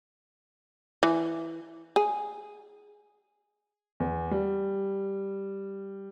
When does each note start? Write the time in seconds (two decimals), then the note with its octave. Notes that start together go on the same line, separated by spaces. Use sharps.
1.03 E3
1.96 G#4
4.00 E2
4.31 G3